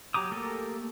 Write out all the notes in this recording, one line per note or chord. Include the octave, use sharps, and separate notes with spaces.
F#3 G4 A#5 D6 D#6
A3 A#3 G4 A4 A#4